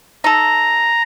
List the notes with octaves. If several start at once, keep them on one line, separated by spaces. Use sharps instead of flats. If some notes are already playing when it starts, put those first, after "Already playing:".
D#4 A4 A#5